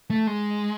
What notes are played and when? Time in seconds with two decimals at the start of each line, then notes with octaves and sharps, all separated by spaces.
0.10 A3
0.27 G#3